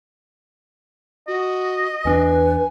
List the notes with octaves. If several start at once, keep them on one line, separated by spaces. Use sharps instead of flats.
F#4 D#5
E2 C#4 D4 B4 G#5